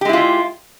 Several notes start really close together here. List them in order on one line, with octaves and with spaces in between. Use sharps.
G4 G#3 E4 F4